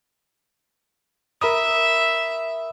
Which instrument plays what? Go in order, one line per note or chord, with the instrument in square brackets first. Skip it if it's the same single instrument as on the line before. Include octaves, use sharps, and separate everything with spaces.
[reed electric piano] A#4 B5 D#6 [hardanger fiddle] E5